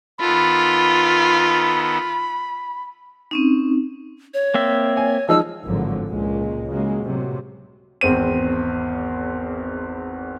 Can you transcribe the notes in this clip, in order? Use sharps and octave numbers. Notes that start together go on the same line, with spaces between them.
D#3 B3 F4 A4 B5
C4 C#4 D#4
C#5
A#3 C4 E5
G#5
F3 G#3 D#4 E6
G#1 A2 D3 F3 F#3
C#2 A#2 G#3
C#3 F#3 G#3 A#3
A2 C3 F#3
G#1 E2 C4 D#7